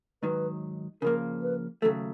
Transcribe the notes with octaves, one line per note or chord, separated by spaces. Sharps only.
G#2 D#3 F#3 B4
C#3 F3 A#3 A#4
B4
D#2 C#3 F#3 A3 A4